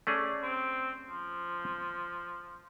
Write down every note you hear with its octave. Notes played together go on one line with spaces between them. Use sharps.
A3 C#4 G#4 D5
C4
F3